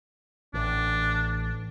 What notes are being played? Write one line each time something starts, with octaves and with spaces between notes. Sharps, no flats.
A1 D4